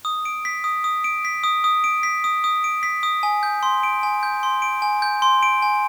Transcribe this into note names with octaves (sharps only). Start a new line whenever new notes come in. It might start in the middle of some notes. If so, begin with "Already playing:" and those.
D#6
D7
B6
D#6
D#6
D7
B6
D#6
D#6
D7
B6
D#6
D#6
D7
B6
D#6
G#5
G6
C6
D7
G#5
G6
C6
D7
G#5
G6
C6
D7
G#5